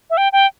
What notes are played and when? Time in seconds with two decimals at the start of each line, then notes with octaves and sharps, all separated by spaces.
0.10 E5
0.17 G5
0.33 G5